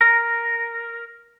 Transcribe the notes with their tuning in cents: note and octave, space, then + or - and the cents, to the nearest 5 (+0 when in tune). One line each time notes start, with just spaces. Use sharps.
A#4 +0